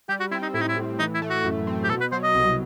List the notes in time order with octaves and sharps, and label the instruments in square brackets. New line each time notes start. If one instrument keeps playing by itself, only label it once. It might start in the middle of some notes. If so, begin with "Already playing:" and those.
[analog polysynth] G3 [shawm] G4
[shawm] F#4
[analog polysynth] C4 [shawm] E4
[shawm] D#4
[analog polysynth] A2 [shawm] E4
[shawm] D#4
E4
[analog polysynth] A2
[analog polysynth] E3 [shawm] D#4
[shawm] E4
[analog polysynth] A3
[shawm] F#4
[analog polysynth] F#2
C4
[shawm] G4
[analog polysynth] B2 [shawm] A4
[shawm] B4
[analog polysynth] F#3 [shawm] C5
[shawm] D#5
[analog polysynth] C2